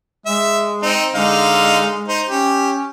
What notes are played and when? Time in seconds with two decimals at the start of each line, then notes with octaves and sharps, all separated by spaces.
0.26 G#3 E5
0.82 C4 D#4
1.15 D3 G#3 D#4 F5
2.08 D#4 C5
2.29 C#4 G4